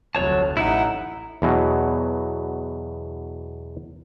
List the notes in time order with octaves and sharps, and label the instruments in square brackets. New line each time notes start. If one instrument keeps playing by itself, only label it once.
[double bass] F1 D2 [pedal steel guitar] F#3 C#5 A5
[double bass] A1 D#4 [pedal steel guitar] E4 F#5
[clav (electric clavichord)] E2 B2 F#3